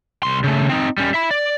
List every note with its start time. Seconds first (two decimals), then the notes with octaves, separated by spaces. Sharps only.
0.23 C2 C6
0.44 C#3 A3
0.69 C4 D#4
0.98 G3 C#4
1.14 E5 B5
1.31 D5